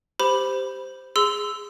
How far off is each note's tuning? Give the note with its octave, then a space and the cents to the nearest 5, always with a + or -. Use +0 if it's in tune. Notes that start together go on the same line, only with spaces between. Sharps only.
G4 +0 C5 -10 B5 +0
G#4 -10 C6 -30 E6 +0